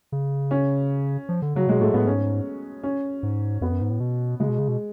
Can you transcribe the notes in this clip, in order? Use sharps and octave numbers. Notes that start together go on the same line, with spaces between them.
C#3
C#4
F3
D3
C#3 F#3
B2 G#3
A2 A3
A2 B3
G#2 C#4
C#4
G#2
F2 B3
F#2
G#2
A2
B2
C#3 G#3
B2
C#3
B2